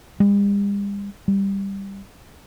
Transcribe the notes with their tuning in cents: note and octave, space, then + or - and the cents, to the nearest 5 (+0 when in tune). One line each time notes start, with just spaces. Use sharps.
G3 +45
G3 +5